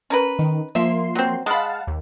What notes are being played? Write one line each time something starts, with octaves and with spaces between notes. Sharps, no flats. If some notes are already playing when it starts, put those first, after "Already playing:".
C#4 A#4 B4
D#3
F3 A#3 E5 C6
F#3 C4
G#3 F5 F#5 A5 B5
D#2